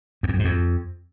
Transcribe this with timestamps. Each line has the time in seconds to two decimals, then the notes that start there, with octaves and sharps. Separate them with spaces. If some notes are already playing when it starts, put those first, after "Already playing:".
0.23 F#2
0.29 F2
0.34 F#2
0.39 G#2
0.45 F2